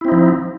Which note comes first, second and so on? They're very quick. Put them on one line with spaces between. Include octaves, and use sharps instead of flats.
E4 C4 D#4 F3